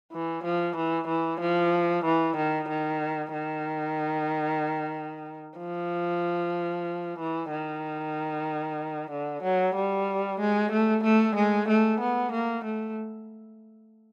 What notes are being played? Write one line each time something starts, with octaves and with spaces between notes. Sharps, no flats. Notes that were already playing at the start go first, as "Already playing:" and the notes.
E3
F3
E3
E3
F3
E3
D#3
D#3
D#3
F3
E3
D#3
D3
F#3
G3
G#3
A3
A3
G#3
A3
B3
A#3
A3